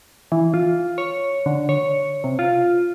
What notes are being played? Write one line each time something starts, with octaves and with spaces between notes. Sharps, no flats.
E3
F4
C#5
D3
C#5
C3
F4